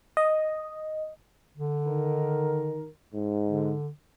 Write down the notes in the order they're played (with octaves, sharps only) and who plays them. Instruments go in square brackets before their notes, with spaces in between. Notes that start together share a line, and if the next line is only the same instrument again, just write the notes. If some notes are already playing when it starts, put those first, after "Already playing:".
[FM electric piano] D#5
[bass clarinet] D3
[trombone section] D#3 A#4
G#2
[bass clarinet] D3